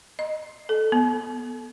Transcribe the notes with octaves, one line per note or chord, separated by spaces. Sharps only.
D#5
A4
B3